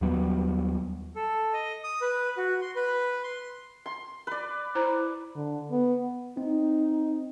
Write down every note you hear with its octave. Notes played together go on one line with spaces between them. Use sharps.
D#2 F#3 G3 B3
A4
D#5
D#6
B4
F#4
C6
B4
C6
C6
B4 D5
E4 C5 A#5
D3
B3
C4 D#4